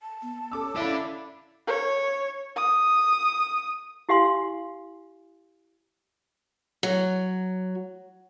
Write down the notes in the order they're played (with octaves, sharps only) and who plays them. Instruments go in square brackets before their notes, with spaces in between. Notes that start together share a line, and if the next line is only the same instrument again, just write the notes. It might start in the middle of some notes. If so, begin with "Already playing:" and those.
[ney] A5
[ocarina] B3
[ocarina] C#4 [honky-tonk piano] A4 D6 E6
[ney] E4 [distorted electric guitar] A4 D5 [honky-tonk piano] E5 F5 B5
[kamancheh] C#5
D#6
[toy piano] E4 G4 F5 G#5 C6
[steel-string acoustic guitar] F#3